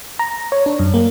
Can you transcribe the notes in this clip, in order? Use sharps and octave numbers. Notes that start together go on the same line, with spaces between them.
A#5
C#5
D4
F#2
A#3